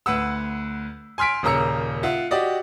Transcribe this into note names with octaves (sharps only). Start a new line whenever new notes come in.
D2 B4 F#5 E6
G#5 C6 F6 B6 D7
D#1 C#3 A#3 A#5 E6 C#7
F4 E5 F#5
F#4 G4 D5 D#5